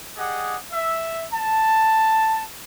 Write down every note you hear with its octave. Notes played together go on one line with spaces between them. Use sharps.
G4 G#4 D5 D#5 F#5
E5
A5